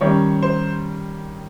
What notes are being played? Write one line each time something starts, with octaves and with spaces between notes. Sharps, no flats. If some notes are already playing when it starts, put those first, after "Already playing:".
D#3 G3 C#4 C#5
C5